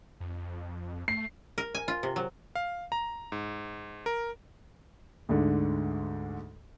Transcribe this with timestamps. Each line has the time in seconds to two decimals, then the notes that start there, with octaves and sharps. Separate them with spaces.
0.20 F2
1.08 A3 C7
1.58 A#4
1.75 G#5
1.88 F4
2.03 C3
2.16 F#3
2.55 F5
2.92 A#5
3.32 G#2
4.06 A#4
5.29 D2 G#2 D3